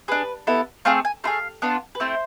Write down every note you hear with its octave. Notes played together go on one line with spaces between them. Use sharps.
D4 G#4 B4
B3 E4 A4
A3 C4 G#4 F5
G#5
A3 E4 G#4 F5
B3 D4 F4
B4
A3 C4 E4 C5